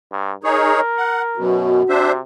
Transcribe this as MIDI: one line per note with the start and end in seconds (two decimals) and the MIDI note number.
0.12 0.32 43
0.44 0.80 63
0.44 0.80 68
0.44 1.46 70
0.44 0.80 73
0.98 1.22 78
1.37 1.82 42
1.37 1.82 47
1.37 2.19 66
1.89 2.20 48
1.89 2.12 62
1.89 2.12 72
1.89 2.12 76